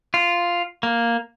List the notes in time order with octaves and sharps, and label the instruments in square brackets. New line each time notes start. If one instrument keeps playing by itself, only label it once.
[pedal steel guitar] F4
A#3